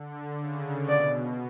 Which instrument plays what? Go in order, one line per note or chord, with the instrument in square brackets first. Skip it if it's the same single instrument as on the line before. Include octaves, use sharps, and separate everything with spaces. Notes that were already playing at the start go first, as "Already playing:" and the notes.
Already playing: [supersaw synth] D3
C#3
[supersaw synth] B2 [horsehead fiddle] D5